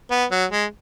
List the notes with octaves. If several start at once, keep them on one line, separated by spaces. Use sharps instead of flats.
B3
F#3
G#3